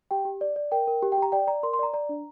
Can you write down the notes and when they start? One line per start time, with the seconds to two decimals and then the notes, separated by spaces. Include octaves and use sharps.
0.11 G4 G5
0.25 G4
0.41 D5
0.56 D5
0.72 A#4 G5
0.87 A#4
1.03 G4
1.12 G5
1.18 G4 A#5
1.32 D5 G5
1.47 D5 A#5
1.63 A#4 C6
1.73 C6
1.79 D5 A#5
1.93 D5 A#5
2.09 D4